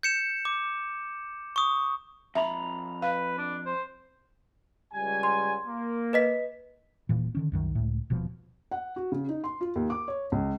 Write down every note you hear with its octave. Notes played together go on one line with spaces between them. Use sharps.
G6 C#7 E7
D6
C#6 D#6
F2 E5 A#5 B5
B4 F5
D4
C5
C#2 G3 G#5
C6
A#3
B4 D#5 B6
D#1 A#2 E3
D3 D#3 C#4
C2 F#2 D#3
C#2 A2
D#1 B2 F3
F#5
F#4
C#3
D#4
C6
F4
D#2
D6
C#5
C#2